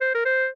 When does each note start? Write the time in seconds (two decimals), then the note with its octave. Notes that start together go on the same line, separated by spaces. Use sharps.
0.01 C5
0.15 A#4
0.25 C5